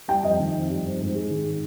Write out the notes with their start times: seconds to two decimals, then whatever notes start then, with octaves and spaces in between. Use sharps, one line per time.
0.08 G3 G5
0.23 F2 D#5
0.40 D#3
0.54 F2
0.70 G3
0.85 F2
1.00 G#2
1.15 G#3
1.31 D#3